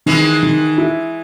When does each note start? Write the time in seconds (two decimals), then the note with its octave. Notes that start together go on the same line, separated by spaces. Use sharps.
0.06 D#3 E3 G#3
0.43 D#3
0.78 E4